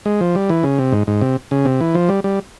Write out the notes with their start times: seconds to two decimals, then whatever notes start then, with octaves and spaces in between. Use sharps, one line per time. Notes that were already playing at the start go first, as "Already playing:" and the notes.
0.06 G#3
0.21 F3
0.35 G3
0.49 E3
0.63 C#3
0.78 C3
0.92 G#2
1.07 G#2
1.21 C3
1.51 C#3
1.65 C3
1.81 E3
1.95 F3
2.09 G3
2.24 G3